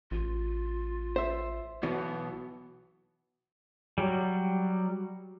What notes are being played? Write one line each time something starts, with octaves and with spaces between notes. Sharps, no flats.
A1 F4
C5 E5
B1 B2 E3 B3
F#3 G3